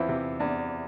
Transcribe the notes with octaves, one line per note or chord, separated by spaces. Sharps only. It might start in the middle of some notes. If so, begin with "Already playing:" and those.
Already playing: E2 E3 C4 E4 F4
C3
E2 D4